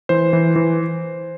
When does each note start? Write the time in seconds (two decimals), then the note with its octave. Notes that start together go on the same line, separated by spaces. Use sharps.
0.09 E3 C5
0.33 E3
0.56 E3